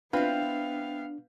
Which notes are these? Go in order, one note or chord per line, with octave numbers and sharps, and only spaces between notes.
B3 C4 D4 E4 F4 B4 F5